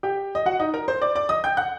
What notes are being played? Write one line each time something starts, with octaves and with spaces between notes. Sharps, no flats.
G4 G5
D#5
F#4 F#5
D#4 D#5
A#4 A#5
C5 C6
D5 D6
D5 D6
D#5 D#6
G5 G6
F#5 F#6